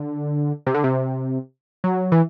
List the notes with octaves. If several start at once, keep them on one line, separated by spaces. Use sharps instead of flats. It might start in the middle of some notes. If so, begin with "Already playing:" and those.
Already playing: D3
C3
D3
C3
F#3
E3